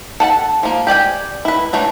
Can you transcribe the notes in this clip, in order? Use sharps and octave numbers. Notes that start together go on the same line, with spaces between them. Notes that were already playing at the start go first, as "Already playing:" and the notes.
A4 F#5 G#5 A5
F3 A#3
G4 D5 G5 G#5
E4 B4
E3 F#3 A3 D4